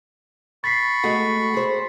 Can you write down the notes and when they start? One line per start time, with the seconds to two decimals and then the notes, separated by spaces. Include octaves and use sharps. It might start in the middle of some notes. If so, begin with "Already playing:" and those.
0.64 B5 C#6 A6 B6 C7
1.04 G#3 A3 F#4
1.54 G#4 C5